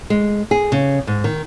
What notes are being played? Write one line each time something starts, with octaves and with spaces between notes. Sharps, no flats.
G#3
G#4
C#3
G#2
D#3